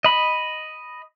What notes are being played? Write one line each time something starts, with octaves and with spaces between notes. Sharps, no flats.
D#5 B5